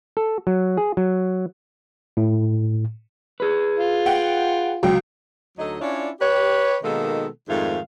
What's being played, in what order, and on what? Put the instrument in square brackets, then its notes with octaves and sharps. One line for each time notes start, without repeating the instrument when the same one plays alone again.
[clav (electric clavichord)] A4
F#3
G#4
F#3
[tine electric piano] A2
[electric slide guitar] G#4 B4
[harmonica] F4
[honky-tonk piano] F#5 G5
[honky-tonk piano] C#2 G5 [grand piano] F#3
[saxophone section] D2 F#3 D#4 A4 D#5
C#4 D4 E4 F4 C#5 D5
G4 B4 C#5
B2 D#3 G#3 A#3 D#4 A4
F2 G#2 D#3 A3 F4 F5